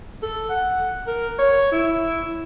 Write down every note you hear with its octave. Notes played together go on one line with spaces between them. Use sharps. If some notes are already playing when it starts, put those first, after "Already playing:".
A4
F#5
A#4
C#5
E4